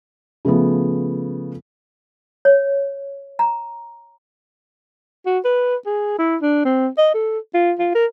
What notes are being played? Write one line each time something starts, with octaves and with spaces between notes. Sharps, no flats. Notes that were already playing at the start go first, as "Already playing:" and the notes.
C#3 F3 A3 B3
C#5
A#5
F#4
B4
G#4
E4
D4
C4
D#5
A4
F4
F4
A#4